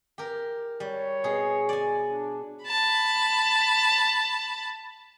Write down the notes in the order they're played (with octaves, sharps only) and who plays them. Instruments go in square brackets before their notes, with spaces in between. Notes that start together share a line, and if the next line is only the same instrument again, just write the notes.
[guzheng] G4 A#4
[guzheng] G3 [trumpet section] C#5
[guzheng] B2 G#4
D5 G#5
[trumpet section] D4
[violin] A5 B5